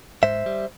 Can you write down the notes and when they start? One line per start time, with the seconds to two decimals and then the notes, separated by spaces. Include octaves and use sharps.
0.23 G#2 C5 E5
0.46 G3